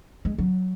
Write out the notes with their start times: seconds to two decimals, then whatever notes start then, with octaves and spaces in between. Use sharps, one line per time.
0.25 G#3
0.38 F#3